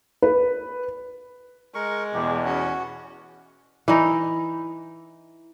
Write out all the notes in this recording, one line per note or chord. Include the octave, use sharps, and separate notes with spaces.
B4
G#3 A#4 C#6
E2 B2 G4
C#4 F#4
E3 D#4